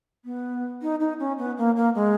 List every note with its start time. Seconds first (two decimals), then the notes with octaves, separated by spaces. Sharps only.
0.25 B3
0.82 D#4
1.00 D#4
1.19 C#4
1.38 B3
1.58 A#3
1.76 A#3
1.95 G#3